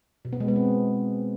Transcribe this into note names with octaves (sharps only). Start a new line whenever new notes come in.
B2
B3
G#3
B3
C4